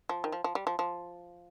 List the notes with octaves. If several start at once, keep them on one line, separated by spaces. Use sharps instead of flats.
F3
D#3
F3
F3
G3
F3
F3